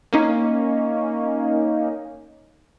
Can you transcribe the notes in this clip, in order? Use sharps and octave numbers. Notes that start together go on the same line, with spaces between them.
A#3 C#4 D#4